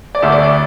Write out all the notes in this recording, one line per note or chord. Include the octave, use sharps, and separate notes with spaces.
D5
D2 D3 E5
D5
D5